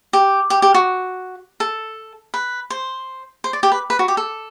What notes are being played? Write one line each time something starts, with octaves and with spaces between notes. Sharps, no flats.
G4
G4
G4
F#4
A4
B4
C5
C5
D5
G4
B4
B4
F#4
G4
A4